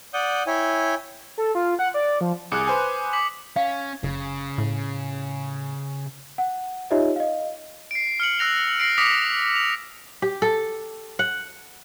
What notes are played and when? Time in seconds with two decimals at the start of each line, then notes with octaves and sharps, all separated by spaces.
0.14 D5 F#5 D#6 G6
0.47 E4 C#5 G5 G#5
1.38 A4
1.55 F4
1.79 F#5
1.94 D5
2.21 F3
2.52 C2 G#4 D6 D#6 F#6 C#7
2.68 B4 C5 G#5
3.13 D6 B6 F#7
3.56 C#4 F5
4.03 F#1 C#3
4.58 A2
6.38 F#5
6.91 D#4 F4 G4 C#5 D#5 E5
7.16 D#5 F5
7.91 C7 D7
8.20 F6 C#7 F#7
8.39 E6 F#6 A#6 F7
8.80 A#6 C7 D7
8.98 D6 D#6 A#6 B6 C#7 F7
9.56 F7
10.22 G4
10.42 A4
11.19 F#5